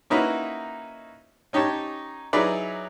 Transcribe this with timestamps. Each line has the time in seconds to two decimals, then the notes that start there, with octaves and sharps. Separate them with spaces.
0.10 A#3 C#4 D#4 E4 F#4 B4
1.53 C#4 D#4 G4 C#5 A5
2.33 F#3 D#4 E4 G#4 B4 D5